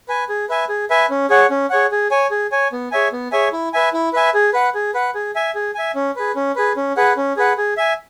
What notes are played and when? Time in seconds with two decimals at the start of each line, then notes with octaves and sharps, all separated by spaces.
0.08 B4 G#5
0.29 G#4
0.49 B4 E5 G#5
0.69 G#4
0.90 B4 E5 G#5
1.10 C#4
1.30 G#4 C#5 F#5
1.50 C#4
1.70 G#4 C#5 F#5
1.91 G#4
2.11 C#5 G#5
2.31 G#4
2.52 C#5 G#5
2.72 B3
2.91 G#4 C#5 E5 G#5
3.12 B3
3.32 G#4 C#5 E5 G#5
3.52 E4
3.73 B4 E5 G#5
3.93 E4
4.13 B4 E5 G#5
4.34 G#4
4.53 B4 F#5
4.75 G#4
4.94 B4 F#5
5.15 G#4
5.35 E5 G#5
5.55 G#4
5.75 E5 G#5
5.95 C#4
6.16 G#4 B4
6.36 C#4
6.56 G#4 B4
6.76 C#4
6.97 G#4 B4 F#5
7.17 C#4
7.37 G#4 B4 F#5
7.58 G#4
7.77 E5 G#5